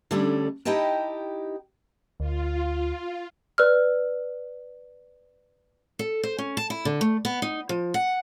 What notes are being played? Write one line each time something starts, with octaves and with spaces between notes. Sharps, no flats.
D3 G3 A3 C#4 D4 A4
D#4 E4 G4 D#5 G5 A5
D2 F4
B4 D5 E6 F6
A4
C5
C#4
A5
E4
D3
A3
B3
D#4
F3
F#5